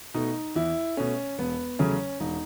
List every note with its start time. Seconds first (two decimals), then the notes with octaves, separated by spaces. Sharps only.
0.14 B2 A3 D#4
0.55 E2 E4
0.97 B2 A3 C#4
1.38 E1 B3
1.79 E2 C#3 F#3 A3 C#4
2.20 E1 D#4